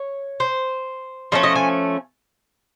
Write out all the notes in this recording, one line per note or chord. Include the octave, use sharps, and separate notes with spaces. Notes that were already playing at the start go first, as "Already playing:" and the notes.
Already playing: C#5
C5
D3 F3 A3 C#4
D#5
G#5